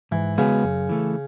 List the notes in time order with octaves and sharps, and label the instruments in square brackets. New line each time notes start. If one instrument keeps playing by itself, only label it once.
[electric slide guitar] G#2 [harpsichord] E3
[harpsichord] C#3 [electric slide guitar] G#3 B3 F#4 B4
[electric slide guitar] F#2
E3 A3